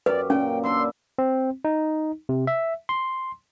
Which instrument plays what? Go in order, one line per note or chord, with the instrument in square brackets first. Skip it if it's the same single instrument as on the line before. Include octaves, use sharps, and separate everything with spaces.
[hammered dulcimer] F#2 G4 [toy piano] B4 [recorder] D5
[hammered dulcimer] A#2 [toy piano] C#4 [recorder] G5
[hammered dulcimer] D4 E4 E5 [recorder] C6
[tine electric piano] C4
D#4
C3
E5
C6